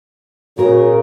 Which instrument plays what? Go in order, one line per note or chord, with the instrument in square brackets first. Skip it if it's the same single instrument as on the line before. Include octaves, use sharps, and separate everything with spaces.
[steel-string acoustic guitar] A#2 A#4 [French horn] C#3 [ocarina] F#4